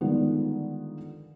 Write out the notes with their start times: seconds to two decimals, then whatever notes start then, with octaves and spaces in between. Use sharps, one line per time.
0.01 D3 D#3 F3 G3 G#3 B3